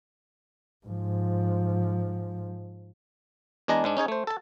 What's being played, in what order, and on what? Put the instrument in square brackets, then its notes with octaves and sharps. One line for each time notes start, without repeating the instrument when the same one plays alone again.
[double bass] G#2 F3
[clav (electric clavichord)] E2 G#3 D4 G#4 D#5 A#5
G#2 G#3 D4
C#4 D#4 G#4 C#5
A3 C5
A4 A5